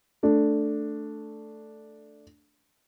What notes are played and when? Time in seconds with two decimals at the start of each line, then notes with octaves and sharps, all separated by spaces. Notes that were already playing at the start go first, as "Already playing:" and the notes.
0.23 A3 D4